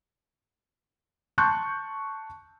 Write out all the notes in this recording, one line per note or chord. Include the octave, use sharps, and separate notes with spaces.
A5 C6 C#6 F#6 G6